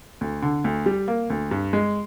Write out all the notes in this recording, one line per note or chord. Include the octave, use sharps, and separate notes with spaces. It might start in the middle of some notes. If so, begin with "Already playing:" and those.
D2
D3
D2
G3
A#3
D2
G2
G#3